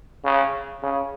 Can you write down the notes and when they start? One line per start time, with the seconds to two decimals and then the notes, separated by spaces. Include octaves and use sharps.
0.25 C#3
0.83 C#3